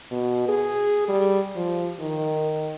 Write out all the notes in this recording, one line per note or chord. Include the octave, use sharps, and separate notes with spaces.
B2
G#4
G3
F3
D#3